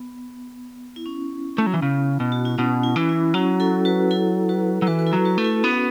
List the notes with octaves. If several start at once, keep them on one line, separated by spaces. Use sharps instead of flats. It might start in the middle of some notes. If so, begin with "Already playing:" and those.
Already playing: B3
E4
C#4
A3
F#3
E3
C#3
B2
F#4
E4
B2 C#4
E4
E3
E4
F#3 C#4 F#4
E4 A4
F#4 B4
E4 A4
F#4 B4
F#3
E3 F#4 B4
B4
E4 A4
F#3
F#4 B4
A3
E4 A4
B3 C#4 F#4